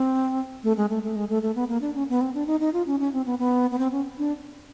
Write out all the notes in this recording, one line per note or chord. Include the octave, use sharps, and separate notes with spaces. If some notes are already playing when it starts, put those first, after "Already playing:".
Already playing: C4
A3
G#3
A3
A3
G#3
A3
A3
B3
A#3
D4
C#4
B3
C4
D4
D#4
D#4
F4
C#4
C#4
C4
B3
B3
B3
C4
C#4
D4